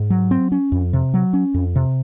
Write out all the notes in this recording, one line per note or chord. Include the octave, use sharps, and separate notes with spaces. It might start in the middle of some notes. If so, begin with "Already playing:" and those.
Already playing: G#2
F#3
C4
C#4
F2
C3
F#3
C#4
F2
C3